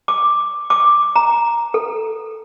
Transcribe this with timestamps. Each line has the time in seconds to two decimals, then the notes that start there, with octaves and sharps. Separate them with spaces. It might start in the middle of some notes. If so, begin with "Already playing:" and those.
0.08 D6
0.70 D6
1.16 A#5
1.74 A4